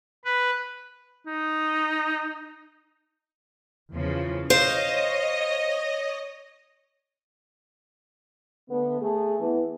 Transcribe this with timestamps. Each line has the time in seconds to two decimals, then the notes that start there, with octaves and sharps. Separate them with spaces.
0.25 B4
1.26 D#4
3.93 E2 C#3 F3
4.50 C5 C#5 D#5 F5
8.70 D3 A3 B3
9.01 A3 G#4
9.41 E3 B3